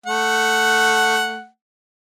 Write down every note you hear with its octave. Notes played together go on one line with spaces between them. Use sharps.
A3 F#5